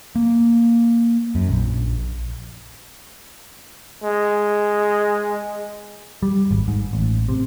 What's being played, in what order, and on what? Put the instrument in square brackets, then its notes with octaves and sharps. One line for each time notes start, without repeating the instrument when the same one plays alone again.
[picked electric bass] A#3
F#2
A#1
[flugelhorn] G#3
[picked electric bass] G3
G#1
G#2
A1
C3